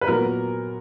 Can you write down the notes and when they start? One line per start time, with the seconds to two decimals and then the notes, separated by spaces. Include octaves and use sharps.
0.01 B4
0.07 A#2 F#3 B3 A#4